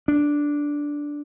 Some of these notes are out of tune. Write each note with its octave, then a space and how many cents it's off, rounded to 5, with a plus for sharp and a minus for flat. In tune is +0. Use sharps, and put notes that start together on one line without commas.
D4 -5